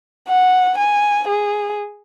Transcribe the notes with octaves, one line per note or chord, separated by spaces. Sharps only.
F#5
G#5
G#4